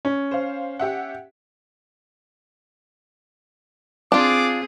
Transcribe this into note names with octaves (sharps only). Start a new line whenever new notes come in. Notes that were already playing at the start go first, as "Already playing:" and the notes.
C#4
C5 F5
G4 E5 F#5
C4 D4 F4 G#4 D6